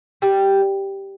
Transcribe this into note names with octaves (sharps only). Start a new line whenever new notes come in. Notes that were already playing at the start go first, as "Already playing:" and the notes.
G3